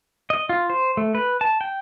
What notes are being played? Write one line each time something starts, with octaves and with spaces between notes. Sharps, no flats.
D#5
F4
C5
A3
B4
A5
G5